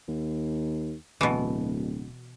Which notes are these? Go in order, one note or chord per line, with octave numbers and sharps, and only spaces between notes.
D#2
D1 B2 E3